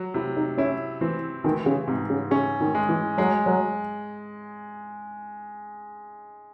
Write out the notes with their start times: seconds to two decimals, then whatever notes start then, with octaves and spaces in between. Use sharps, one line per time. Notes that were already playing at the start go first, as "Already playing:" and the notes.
Already playing: F#3
0.14 C3 E4
0.36 D#4
0.57 C#4 E4
1.01 E3 C4
1.44 D#3 E3
1.66 C#3
1.87 G#2 C3
2.10 C#3
2.31 C#3 C#4
2.60 D#3
2.75 G#3
2.89 E3
3.18 F#3 G#3
3.46 F#3